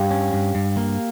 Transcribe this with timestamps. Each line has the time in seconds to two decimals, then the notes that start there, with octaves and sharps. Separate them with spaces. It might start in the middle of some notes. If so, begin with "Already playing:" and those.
Already playing: G2 G4 F5 G5
0.11 C#4
0.33 G2
0.55 G2
0.77 A#3